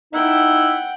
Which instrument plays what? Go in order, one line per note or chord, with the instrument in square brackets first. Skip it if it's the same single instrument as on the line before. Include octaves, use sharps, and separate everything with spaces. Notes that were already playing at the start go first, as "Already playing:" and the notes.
[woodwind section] D#4 E4 [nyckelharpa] F#5 G5